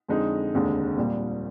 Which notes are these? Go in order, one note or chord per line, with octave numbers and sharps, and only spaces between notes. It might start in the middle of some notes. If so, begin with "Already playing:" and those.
F2 D3 G#3 D#4
F1 D#2 D3 G#3
A#1 A#2 G3